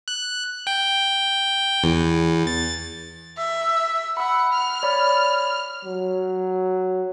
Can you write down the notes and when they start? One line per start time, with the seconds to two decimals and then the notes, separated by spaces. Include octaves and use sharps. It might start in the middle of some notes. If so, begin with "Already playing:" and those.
0.08 F#6
0.67 G5
1.84 E2
2.47 A6
3.37 E5
4.17 F#5 B5 E6
4.53 F6
4.83 C#5 D5 B5
5.85 F#3